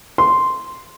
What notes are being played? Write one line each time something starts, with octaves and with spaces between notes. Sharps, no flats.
C6